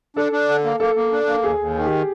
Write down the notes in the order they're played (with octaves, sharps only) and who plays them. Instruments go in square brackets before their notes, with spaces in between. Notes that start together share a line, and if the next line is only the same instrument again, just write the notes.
[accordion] D4 [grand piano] A4
[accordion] D4
D3
A#3
[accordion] A#3 [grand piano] A4
[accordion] A#3
D4
A#3
[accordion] D#2 [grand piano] G#4
[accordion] D#2
D#3
[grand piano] G4